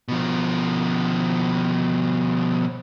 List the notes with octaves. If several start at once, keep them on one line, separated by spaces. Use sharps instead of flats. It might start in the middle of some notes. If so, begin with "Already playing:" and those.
B2 F3